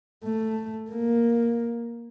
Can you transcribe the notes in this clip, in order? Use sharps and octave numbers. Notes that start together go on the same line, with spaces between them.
A3
A#3